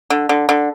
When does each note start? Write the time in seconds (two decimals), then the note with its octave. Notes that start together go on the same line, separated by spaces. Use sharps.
0.10 D3
0.29 D3
0.49 D3